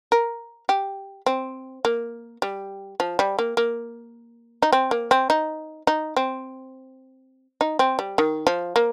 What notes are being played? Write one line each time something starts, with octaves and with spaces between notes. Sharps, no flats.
A#4
G4
C4
A#3
G3
F3
G3
A#3
A#3
D#4
C4
A#3
C4
D#4
D#4
C4
D#4
C4
G3
D#3
F3
A#3